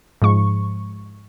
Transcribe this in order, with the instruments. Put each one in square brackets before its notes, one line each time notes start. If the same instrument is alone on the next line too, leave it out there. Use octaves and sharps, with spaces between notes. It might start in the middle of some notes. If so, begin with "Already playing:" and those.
[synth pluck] G#2 F3 G#3 C#6